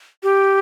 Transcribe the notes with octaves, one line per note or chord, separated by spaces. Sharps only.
G4